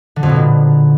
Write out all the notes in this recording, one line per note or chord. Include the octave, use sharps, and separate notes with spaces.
D3
F2
B2
A#2